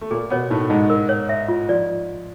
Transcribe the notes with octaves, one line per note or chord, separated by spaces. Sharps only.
A3
A#2 A#3 G#4
B2 B3 C#5
A2 A3 D#4
G#2 G#3 D#4
A#4
C#5
E5
F4
F3 D5